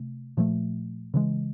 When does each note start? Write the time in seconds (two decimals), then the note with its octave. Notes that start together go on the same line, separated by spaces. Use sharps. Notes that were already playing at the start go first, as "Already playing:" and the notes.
Already playing: C3 A3
0.37 A#2 F3 A3
1.14 C#3 E3 G#3